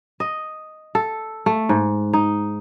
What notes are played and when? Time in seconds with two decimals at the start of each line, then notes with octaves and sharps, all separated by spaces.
0.20 D#5
0.95 A4
1.46 A3
1.69 G#2
2.13 D#4